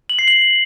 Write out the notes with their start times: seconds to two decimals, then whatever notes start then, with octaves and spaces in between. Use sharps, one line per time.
0.10 F#7
0.19 C7
0.28 F#7